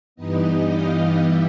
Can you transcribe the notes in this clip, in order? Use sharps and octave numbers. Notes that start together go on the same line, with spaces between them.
G2 E3 G3 B3 D#4 D#5
F5
E3 G3 E5